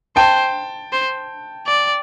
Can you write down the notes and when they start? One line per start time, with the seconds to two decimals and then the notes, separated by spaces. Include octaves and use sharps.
0.16 C5 G5 A5
0.93 C5
1.67 D5